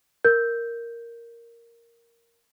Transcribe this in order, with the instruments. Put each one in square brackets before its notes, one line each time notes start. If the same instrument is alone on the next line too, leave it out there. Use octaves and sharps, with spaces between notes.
[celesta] A#4 G6